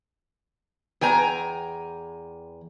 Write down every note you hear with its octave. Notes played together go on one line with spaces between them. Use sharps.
E2 G5 G#5 A#5